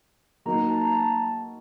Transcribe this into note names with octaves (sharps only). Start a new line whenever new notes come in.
F#3 A#3 D#4 A#5
A5
A#5
A5